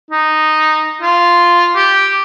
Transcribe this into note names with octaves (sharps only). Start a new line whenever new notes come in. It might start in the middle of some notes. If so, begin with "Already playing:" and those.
D#4
F4
G4